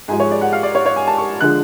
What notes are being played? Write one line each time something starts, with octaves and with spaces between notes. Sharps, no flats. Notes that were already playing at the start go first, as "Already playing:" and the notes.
G#2 F3 G#3 G#5
C#5
D5
F#5
F5
D5
C#5
C#5
G#5
A5
C#6
D3 F3 G#3 F#6